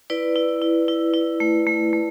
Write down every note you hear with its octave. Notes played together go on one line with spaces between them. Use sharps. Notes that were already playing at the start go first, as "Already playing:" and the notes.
E4 B4 D5
E4
E4
E4
E4
A3
A3
A3